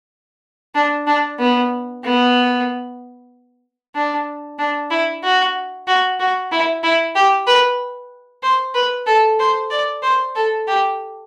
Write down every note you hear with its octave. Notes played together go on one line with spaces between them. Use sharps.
D4
D4
B3
B3
D4
D4
E4
F#4
F#4
F#4
E4
E4
G4
B4
C5
B4
A4
C5
D5
C5
A4
G4